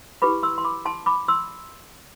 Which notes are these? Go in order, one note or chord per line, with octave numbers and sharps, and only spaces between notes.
E4 G4 B4 B5 D6
C6 E6
C6
B5 D6
A5 C6
B5 D6
C6 E6